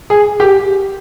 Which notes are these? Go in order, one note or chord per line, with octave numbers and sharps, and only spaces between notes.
G#4
G4